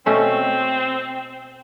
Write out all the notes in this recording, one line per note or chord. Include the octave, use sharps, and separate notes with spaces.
B2 A3 C4 C#4